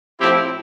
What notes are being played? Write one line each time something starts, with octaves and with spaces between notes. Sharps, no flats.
A2 F3 C4 E4 G4